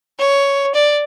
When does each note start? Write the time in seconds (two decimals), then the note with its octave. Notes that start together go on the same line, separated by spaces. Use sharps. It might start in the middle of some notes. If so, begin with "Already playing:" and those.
0.19 C#5
0.74 D5